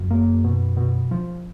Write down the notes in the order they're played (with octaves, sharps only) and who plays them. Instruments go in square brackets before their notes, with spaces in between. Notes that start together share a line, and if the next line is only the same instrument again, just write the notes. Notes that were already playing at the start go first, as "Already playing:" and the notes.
Already playing: [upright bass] F#2
[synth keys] A#3
B2
B2
F3